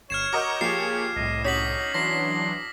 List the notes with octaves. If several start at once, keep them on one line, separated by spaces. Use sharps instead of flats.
G1 C#5 F6 G#6 C7 E7
F#4 A#4 D#5 C#6 D6 G6
F3 A#3 G4 G#4 C7
C2 A2 D#5
C#4 D#4 F#4 D#6 B6 F#7
E3 F#3 D4 C6 A#6